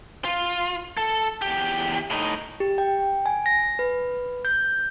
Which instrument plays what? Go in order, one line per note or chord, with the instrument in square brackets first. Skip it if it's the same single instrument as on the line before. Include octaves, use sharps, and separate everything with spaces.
[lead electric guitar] F4
A4
E2 G4
A2 D#4
[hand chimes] G4
G5
G#5
A#6
B4
G6